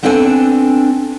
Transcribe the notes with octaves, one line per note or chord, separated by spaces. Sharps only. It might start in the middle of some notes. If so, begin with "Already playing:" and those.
B3 C4 D4 A4 D5 G#5